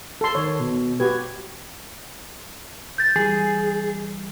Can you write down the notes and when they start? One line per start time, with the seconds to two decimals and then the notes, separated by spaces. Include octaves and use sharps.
0.21 A4 C6
0.35 D#3 C#5
0.59 B2
1.00 F#4 G4 B4 G#6
2.98 G6 A6
3.16 E3 G3 G#4